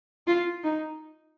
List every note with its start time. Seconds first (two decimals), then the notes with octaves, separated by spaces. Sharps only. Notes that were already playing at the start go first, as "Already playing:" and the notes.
0.27 F4
0.64 D#4